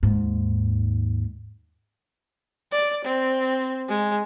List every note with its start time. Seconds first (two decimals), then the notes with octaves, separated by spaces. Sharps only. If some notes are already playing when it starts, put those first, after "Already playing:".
0.03 D#2 G#2
2.72 D5
3.05 C4
3.89 G#3